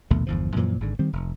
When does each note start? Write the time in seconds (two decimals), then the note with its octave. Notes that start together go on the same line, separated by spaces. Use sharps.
0.11 A#1 D#2 B2 A3
0.27 G1 E2 F3
0.56 F#2 A#2 E3 F3
0.81 G#1 G#2 D3
0.99 D#3 G3 C4
1.13 F1